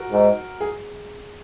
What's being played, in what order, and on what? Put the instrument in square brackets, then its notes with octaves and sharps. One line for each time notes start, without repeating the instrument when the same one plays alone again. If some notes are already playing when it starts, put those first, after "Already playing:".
Already playing: [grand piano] F#4 A#4
[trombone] G#2
[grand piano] G#4